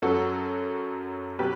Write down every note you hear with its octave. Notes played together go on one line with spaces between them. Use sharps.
F#2 F#3 F#4 A4
B2 F#3 G4 B4